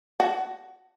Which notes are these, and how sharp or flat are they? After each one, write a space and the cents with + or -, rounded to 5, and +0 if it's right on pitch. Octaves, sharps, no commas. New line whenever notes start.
F#4 +15 F#5 +30 A5 +0